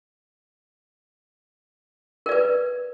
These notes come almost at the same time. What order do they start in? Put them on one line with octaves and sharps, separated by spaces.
A#4 D5 B4